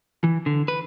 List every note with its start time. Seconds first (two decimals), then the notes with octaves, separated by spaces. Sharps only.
0.24 E3
0.46 D3
0.68 B4